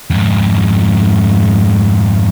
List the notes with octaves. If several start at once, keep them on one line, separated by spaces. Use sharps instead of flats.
F2 G#2